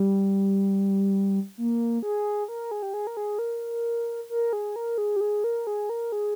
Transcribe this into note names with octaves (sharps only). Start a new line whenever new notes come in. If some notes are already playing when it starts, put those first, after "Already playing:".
Already playing: G3
A#3
G#4
A#4
G#4
G4
G#4
A#4
G#4
A#4
A#4
G#4
A#4
G#4
G4
G#4
A#4
G#4
A#4
G#4